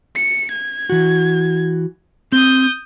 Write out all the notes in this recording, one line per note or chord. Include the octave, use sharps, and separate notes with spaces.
C#7
G#6
E3 F#4
C4 D#6 G6